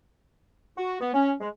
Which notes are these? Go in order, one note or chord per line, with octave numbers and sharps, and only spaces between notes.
F#4
B3
C#4
G#3